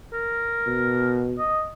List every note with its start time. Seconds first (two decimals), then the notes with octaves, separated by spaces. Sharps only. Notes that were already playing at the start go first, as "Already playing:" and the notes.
0.13 A#4
0.67 B2
1.38 D#5